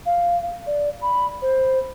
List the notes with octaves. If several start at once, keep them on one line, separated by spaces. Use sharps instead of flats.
F5
D5
B5
C5